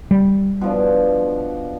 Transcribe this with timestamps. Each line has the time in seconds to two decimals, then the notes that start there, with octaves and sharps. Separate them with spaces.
0.11 G3
0.61 B2 F3 D4